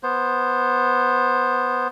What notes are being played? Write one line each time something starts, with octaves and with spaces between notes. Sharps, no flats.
B3 C5